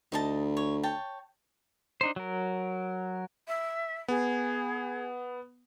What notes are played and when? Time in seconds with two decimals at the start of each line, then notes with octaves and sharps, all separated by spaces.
0.12 D2 D#4 D#5 A5
0.57 C#5
0.83 C#5 G5 A5
2.01 D4 D#4 C5
2.16 F#3 A#4
3.47 E5
4.08 B3 G#4